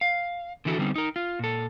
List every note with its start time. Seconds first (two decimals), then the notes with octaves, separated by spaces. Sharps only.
0.01 F5
0.65 D3 E3 E4 F#4 A4
0.78 D3 G3 B3 C4 D#4
0.96 D#4 A#4
1.16 F4
1.39 A#2 A4